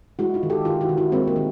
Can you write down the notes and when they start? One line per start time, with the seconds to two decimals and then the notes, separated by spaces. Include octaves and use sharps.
0.19 G#3 E4 F#4
0.34 D#4 F4
0.43 D#3
0.50 G4 A4
0.65 D#3 F4 G4
0.81 E4 F#4
0.89 D#3
0.98 E4 F#4
1.12 G#3 A#3 C4
1.28 A#3
1.36 D#3